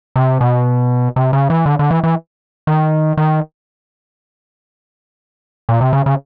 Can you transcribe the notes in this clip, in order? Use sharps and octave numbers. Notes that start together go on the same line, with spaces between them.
C3
B2
C3
C#3
E3
D3
D3
E3
E3
D#3
D#3
A#2
C3
C#3
C#3